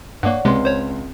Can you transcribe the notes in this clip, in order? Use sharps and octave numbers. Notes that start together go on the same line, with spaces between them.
G2 A#3 C#5 D5 F#5
C#2 C3 G#3 C4 C6
C5 C#5